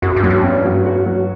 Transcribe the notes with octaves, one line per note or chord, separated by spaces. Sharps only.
F#2 F#4
G2
F#2 F#3
G2
C#4
F#3
F#4
F#3